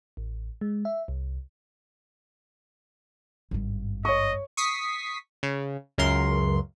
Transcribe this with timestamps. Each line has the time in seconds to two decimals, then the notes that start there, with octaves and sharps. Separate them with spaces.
0.17 A1
0.61 G#3
0.85 E5
1.08 C2
3.51 G#1 G2
4.05 C#5 D#5 C#6
4.57 C#6 D#6 B6 C7
5.43 C#3
5.98 C#2 F#2 A#4 C6